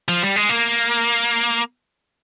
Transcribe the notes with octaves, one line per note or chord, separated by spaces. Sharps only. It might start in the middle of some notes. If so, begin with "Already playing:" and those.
F3
G3
G#3
A#3